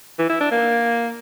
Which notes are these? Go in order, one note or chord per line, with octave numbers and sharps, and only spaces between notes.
E3
E4
D4
A#3